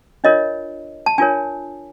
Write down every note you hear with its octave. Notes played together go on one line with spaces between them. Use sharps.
D4 F4 A#4 C#5 D#5
A5
D4 F4 A#4 C#5 G#5